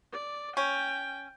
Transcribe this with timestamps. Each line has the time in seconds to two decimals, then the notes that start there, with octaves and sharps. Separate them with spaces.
0.13 D5
0.57 C#4 G5